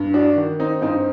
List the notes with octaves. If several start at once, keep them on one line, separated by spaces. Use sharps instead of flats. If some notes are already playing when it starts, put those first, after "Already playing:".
Already playing: G2
D4 F#4
D#3
C4 D#4
G2 C4 D#4